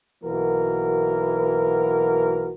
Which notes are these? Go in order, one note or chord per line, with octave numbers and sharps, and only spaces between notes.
B1 E3 A#3 F#4 A#4